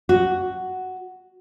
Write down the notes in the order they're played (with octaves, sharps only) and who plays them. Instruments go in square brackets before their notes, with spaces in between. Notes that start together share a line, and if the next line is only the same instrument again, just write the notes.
[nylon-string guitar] F#4